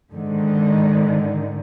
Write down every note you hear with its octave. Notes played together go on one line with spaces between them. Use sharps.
G#2 D3 D#3